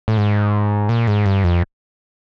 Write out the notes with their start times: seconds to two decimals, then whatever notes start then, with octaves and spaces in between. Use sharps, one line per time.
0.08 A2
0.17 G#2
0.89 A#2
1.08 G#2
1.26 G2
1.44 F2